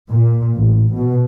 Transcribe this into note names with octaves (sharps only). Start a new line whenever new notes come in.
A#2
A1
B2